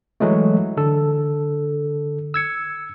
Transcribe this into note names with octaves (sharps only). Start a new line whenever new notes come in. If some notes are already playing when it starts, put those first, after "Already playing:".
E3 F#3 G#3 A3
D3 A4
E6 G#6 C#7